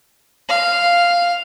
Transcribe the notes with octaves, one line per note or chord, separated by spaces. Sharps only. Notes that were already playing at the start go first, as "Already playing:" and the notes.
F5